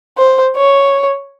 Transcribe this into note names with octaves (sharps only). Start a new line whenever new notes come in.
C5
C#5